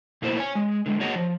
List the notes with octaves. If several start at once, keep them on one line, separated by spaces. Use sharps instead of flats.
B2 A3 A#3 E4 C5
C#5 G#5
G#3
D3 E3 G#3
A#3 F#4 G#4 C#5 D#5 F#5
F3